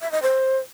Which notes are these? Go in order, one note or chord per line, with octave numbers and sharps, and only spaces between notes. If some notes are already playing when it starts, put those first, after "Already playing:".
E5
D#5
C5